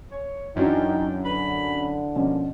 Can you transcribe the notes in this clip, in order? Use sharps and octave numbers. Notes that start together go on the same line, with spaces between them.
C#5
F#2 E3 D4 D#4 F#4 G5
D3 B5
B2 F3 A#3 C#4